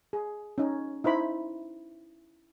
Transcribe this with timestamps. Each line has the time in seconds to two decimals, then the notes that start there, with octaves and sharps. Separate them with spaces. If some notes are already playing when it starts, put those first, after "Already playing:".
0.13 G#4
0.58 C#4 D#4
1.04 D#4 E4 C5 B5